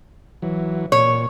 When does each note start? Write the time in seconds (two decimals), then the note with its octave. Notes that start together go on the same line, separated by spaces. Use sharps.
0.42 E3 F#3
0.92 A#2 C#5